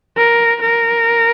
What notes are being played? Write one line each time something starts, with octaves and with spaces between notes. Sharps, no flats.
A#4
A#4